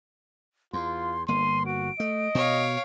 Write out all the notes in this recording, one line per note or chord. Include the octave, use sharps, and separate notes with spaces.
E2 F4 C6
G1 A#3 C6 D#7
F#4 D7
A3 D#5
B2 C#5 F5